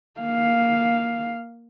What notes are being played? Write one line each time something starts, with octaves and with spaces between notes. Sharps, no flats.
A#3 F5